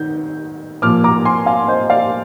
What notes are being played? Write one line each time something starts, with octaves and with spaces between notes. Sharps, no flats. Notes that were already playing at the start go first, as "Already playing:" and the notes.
Already playing: D#3 G6
A#2 F3 A#3 D6 F6
A#5 D6
G#5 C6
F5 G#5
C5 D#5
D5 F5